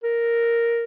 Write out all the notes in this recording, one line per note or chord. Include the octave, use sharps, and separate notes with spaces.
A#4